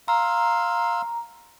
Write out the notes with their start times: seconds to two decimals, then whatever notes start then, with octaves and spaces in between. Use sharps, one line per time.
0.08 F5 A#5 C6 E6